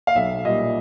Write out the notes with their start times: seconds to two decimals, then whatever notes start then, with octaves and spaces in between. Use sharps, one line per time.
0.07 F5
0.15 B1 E5
0.45 A#2 G3 D#5